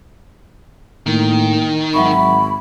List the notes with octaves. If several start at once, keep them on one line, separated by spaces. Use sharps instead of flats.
A2 D#3 A#3
G#1 F#3 E5 B5 C#6